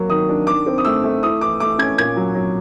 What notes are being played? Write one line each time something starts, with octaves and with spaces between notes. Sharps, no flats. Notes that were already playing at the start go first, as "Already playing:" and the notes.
Already playing: F#3 A#3
D#3 D#6
D4
D#3 D6
C4
D#6
A3 E6
A3
E4 D#6
E3 D6
A3 D6
C#4 G#6
A#2 G#6
F#3
F#3